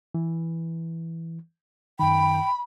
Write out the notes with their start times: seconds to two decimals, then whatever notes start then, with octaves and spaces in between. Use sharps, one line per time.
0.15 E3
1.99 F#2 D#3 G5 B5